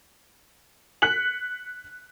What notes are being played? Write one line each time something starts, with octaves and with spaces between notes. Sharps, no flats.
F#6 B6 C#7 F#7